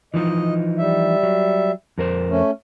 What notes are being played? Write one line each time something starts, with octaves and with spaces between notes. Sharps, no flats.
E3 F3 D#4 D#5
G3 E5
F#3
F2 A#4 C5
A3 C#4